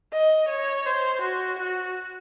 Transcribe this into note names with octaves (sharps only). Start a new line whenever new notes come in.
D#5
C#5
C5
F#4
F#4